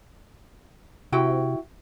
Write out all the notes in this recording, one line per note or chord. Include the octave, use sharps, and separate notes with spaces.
C3 E4 F#4 G5